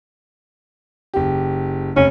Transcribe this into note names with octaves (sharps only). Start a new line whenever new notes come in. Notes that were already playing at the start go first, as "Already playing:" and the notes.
F#1 G4
F1 C#4